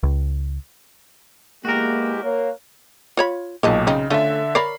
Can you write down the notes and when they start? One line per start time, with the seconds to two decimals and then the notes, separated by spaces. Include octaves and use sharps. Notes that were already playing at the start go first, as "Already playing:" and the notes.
0.03 C#2
1.65 E2 G#3 A#3 F#4 G4 A#4
2.24 A#3 C#5
3.17 F4 C#5 B5
3.63 B1 A#2 D#3 G#3 A5
3.87 C#3 C4 D#4
4.10 D3 A3 C#4 F4 A4 E5
4.55 A#4 C#5 D5 B5 C7